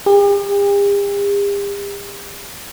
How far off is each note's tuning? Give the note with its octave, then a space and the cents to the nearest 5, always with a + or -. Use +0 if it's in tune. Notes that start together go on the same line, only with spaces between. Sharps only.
G4 +45